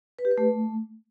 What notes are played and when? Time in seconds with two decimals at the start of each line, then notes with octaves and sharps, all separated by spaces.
0.19 B4
0.25 G4
0.31 B4
0.38 A3